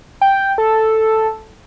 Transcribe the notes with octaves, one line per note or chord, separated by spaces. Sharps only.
G5
A4